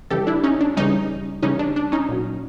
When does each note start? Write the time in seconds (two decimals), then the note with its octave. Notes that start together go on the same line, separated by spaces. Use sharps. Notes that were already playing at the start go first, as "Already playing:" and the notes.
0.10 C#3 E3 G3 G4 A4
0.27 D4 E4
0.44 C#4 D#4
0.61 D4
0.77 C#3 E3 G3 C#4 D#4
1.43 C#3 E3 G3 C#4 D#4
1.59 D4
1.76 D4
1.92 C#4 D#4
2.09 A#2 F#3